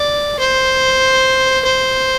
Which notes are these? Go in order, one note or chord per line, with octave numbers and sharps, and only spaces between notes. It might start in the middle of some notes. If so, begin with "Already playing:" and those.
Already playing: D5
C5
C5